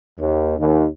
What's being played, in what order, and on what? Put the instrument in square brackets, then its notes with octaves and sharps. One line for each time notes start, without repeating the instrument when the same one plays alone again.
[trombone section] D#2
D#2